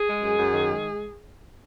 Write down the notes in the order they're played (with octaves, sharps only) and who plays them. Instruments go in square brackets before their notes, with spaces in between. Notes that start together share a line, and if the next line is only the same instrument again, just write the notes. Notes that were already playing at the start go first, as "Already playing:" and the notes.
Already playing: [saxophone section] G#4
G#3
F#2
F#2
D#3
G#3